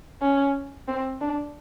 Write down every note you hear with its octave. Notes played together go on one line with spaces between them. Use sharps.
C#4
C4
D4